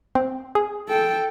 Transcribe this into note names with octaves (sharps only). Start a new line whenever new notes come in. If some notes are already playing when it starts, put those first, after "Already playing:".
C4
G#4
A4 G5